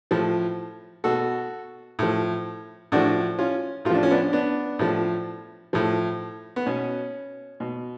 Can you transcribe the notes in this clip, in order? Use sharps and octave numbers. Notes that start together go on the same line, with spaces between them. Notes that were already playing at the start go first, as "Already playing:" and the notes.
A2 F3
B2 F#4 A4
A2 F3
A2 F3 D4 F#4
C#4 F4
A2 F4
F3 D4
C#4
B3 D4
B3 D4
A2 F3
A2 F3
B3
B2 C#4
B2